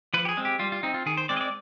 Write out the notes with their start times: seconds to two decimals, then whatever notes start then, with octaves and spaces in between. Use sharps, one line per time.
0.14 F3 B4
0.25 G4
0.29 G#4
0.37 G#3 C4
0.45 G4
0.59 G3 F4
0.72 F4
0.83 C4 D#4
0.94 F4
1.06 D#3 G#4
1.17 C5
1.29 G#3 C4 D5
1.37 D#5
1.41 D5